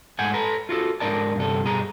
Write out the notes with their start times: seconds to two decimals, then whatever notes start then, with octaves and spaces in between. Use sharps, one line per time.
0.19 G#2 A3 F#5 G#5
0.34 A4 B4 A#5
0.69 F4 F#4 A4
1.00 G#2 D4 A#4 D5 A5
1.36 G2 C3 A4
1.64 G2 B2 G#4 A#5